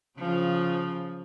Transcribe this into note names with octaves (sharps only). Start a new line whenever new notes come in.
C#3 F3